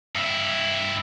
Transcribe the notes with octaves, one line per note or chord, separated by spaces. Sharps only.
G2 E4